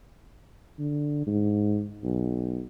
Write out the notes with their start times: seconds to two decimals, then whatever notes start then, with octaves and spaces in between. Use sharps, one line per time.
0.79 D3
1.27 G#2
2.04 B1